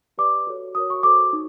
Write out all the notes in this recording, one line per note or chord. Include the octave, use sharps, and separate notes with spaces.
G4 B4 D5 D6
F#4 A4 C#5
F#4 A#4 C#5 D#6
C#6
F#4 A4 C5 D6
D#4